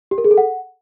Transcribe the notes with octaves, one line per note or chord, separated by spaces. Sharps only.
G4
A#4
G#4
A4
F#5